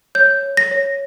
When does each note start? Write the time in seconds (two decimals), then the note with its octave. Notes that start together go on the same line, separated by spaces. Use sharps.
0.15 C#5 G6
0.43 C#5
0.57 A#6
0.71 C#5